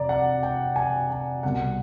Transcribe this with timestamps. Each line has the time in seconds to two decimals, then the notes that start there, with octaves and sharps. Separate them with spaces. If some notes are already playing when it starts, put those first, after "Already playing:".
Already playing: F1 D5 A#5
0.09 F#5
0.43 G5
0.76 G#5
1.10 G#5
1.43 C2 B2 G3 F#5